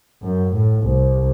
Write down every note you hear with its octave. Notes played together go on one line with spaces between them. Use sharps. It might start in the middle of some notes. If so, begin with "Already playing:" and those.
F#2
A2
C2